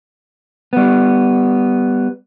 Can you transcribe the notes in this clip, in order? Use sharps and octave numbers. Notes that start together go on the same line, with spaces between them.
G3 B3